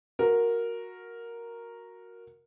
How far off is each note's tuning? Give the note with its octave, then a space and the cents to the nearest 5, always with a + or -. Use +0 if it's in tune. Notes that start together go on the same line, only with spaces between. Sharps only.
F#4 -15 A#4 +0